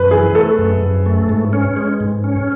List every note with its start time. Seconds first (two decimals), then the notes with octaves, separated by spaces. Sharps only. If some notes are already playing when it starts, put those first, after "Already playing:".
Already playing: F#2 B4
0.11 E3 G#4
0.35 A3 A4
0.59 F#2
0.82 F#2
1.06 A3
1.29 G#2
1.53 C#4
1.76 G#3
2.00 G#2
2.24 C#4